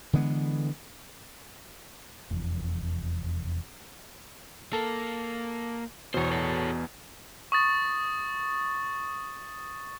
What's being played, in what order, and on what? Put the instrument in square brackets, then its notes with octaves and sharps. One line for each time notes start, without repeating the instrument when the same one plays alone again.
[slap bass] D3 E3 G#3 B3
[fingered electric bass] F1 E2
[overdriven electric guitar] A#3 [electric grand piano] A4
[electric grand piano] E2 B2 [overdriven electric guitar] C5 C#5
[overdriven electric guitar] A4 C#5
[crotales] C#6 D#6 A6